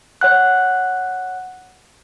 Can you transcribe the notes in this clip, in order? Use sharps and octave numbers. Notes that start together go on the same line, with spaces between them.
C#5 F#5 F#6